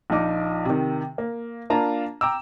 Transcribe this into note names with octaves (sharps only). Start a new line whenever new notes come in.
A#1 F3 D#4 D6
C3 D#3
A#3
A#3 D4 F4 A5 A#5
G5 A#5 D6 E6